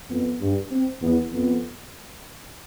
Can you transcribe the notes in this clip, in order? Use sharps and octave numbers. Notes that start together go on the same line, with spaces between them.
F2 B3
G2
C4
E2 B3
F2 B3